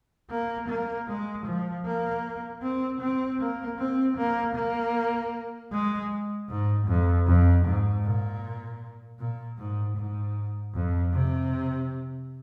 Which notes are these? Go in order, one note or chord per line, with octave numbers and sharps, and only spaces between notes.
A#3
A#3
G#3
F3
A#3
C4
C4
A#3
C4
A#3
A#3
G#3
G#2
F2
F2
G#2
A#2
A#2
G#2
G#2
F2
C3